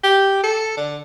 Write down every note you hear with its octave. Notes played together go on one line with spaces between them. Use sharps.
G4
A4
D3